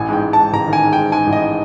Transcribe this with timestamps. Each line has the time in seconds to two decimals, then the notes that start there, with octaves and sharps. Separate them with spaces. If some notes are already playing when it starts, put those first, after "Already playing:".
Already playing: A1 G#5
0.09 G#2 G5
0.23 G#2
0.33 G#2 A5
0.53 A1 A#5
0.68 D#3 G#5
0.83 G#2
0.93 G5
0.98 G#2
1.12 G#2 G#5
1.27 A1
1.33 D#5